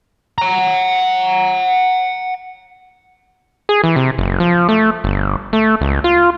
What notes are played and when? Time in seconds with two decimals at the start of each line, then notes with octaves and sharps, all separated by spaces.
0.38 F#5 A#5
3.69 G#4
3.84 E3
3.96 C3
4.18 F#1
4.40 F3
4.69 A3
5.04 G1
5.53 A3
5.81 C#2
6.04 F4